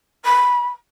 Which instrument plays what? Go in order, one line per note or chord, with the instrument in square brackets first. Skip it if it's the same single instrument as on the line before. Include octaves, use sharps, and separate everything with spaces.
[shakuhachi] B5